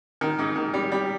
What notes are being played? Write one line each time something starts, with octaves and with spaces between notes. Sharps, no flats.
D#3
G#2
D#3
G3
G3